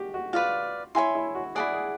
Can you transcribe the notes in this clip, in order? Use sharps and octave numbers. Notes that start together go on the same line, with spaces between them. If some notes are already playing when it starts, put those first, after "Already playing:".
Already playing: F#4 G4
F#4
F4 B4 D5 F5
E4 C#5 E5 G#5 C6
E4
F#4
E4 G#4 A4 D5 F#5
G#4